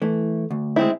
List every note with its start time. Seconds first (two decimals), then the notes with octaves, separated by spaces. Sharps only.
0.02 E3 A3 E4
0.51 D2
0.76 G#3 C4 E4